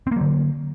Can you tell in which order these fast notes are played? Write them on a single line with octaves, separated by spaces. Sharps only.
C4 A#3 F#3 D3